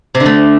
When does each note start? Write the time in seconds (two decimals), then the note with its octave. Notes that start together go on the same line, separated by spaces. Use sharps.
0.15 C3
0.20 D3
0.25 A3